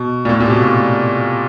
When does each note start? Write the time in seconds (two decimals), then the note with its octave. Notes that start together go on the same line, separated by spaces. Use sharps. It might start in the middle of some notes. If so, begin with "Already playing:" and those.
Already playing: B2
0.25 A#2
0.29 A2
0.40 A#2
0.46 C3
0.50 B2
0.62 A2